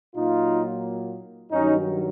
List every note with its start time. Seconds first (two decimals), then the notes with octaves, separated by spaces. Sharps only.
0.15 A#2 F#3 A#3 D#4 F4
1.52 G2 D#3 F#3 C#4 D#4